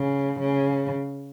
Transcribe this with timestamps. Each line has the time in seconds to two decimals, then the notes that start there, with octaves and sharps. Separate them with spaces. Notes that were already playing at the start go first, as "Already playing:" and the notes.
Already playing: C#3
0.40 C#3